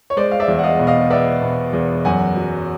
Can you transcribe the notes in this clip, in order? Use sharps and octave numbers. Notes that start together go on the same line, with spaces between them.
C#5
G#3 C5 D5
F5
D5 E5
E2
F#5
D#5 F5
B2
D#5 F5
B3 D5 E5
B2
E2
F#2 F#5 G#5
F#3